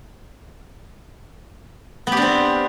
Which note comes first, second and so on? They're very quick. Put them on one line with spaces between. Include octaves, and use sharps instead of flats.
B3 G4 D4 C4